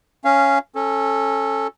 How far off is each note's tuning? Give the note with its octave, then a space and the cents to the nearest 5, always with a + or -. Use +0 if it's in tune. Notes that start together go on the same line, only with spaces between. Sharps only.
C#4 +0 F5 -25
C#4 -20 A4 +0